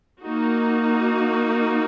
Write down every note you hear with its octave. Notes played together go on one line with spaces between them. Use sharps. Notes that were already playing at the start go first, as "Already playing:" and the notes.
A#3 D#4 F#4